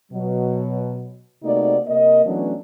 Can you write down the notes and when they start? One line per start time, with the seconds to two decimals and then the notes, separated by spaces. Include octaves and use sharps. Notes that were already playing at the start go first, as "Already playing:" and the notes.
0.12 B2 F#3
1.43 C3 A3 A#3 D#4 F#4 D5
1.87 C3 A#3 A#4 D#5
2.25 E3 F#3 A3 B3 C#4 D4